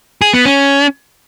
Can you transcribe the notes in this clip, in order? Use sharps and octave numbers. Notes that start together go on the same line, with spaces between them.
G#4
B3
C#4